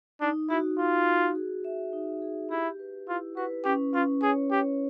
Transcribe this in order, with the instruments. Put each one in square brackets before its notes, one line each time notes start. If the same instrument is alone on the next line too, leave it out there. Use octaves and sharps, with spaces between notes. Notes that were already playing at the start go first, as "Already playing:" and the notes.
[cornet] D4 [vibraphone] D#4
[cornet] E4 [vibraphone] F#4
[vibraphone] D#4 [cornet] F4
[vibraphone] F#4
G#4
E5
D#4
G#4
[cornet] E4 [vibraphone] G4
[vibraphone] B4
[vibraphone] E4 [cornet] F4
[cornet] F#4 [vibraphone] B4
[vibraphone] C#4 [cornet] G4
[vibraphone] C#4 [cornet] F4
[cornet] G#4 [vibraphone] C#5
[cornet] G4 [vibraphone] C#5